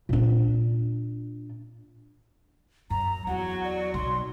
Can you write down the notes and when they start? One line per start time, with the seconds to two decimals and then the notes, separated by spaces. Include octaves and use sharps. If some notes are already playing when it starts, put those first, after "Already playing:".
0.09 A#2 D4
2.90 F#2 A#5
3.27 E2 F#3 C#5 F#5
3.64 D5
3.94 B1 C6